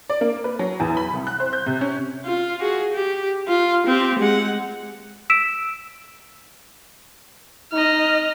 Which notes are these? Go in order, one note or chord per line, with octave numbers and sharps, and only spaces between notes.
D5
A#3
B4
F#3
E2
B5
C2
F#6
C5
G6
C3
C#4
F4
F#4 G#4
G4
F4
C4 G4
G#3 F#5
E6 B6 D7 E7
D#4 D#5 F6